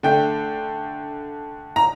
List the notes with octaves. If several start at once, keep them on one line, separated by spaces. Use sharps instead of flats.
D3 A3 G5
A#5